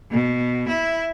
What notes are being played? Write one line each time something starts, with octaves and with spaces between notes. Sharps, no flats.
B2
E4